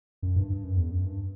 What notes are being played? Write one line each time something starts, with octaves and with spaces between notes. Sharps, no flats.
F#2
G2
G2
F#2
E2
F#2
G2